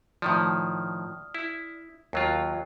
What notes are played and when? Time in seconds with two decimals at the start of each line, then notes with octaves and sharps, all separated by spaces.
0.22 A2 D#3 F3 D5 D#6 F6
1.35 E4
2.13 D#2 F#3 F4 G5